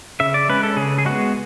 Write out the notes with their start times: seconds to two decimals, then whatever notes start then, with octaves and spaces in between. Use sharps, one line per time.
0.20 C#3 E5
0.34 D5
0.49 G#3 C#4 B4
0.63 A4
0.76 C#3 G#4
0.98 G#4
1.05 G#3 B3 F#4